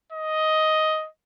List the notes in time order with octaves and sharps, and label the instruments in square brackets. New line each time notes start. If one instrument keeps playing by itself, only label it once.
[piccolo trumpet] D#5